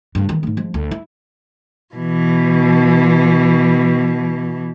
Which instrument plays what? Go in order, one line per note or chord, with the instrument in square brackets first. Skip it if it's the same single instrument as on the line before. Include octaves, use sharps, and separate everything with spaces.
[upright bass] G2 D3
D#3 E3
G#2 A3
F3 G#3
D2
E4
[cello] B2 E3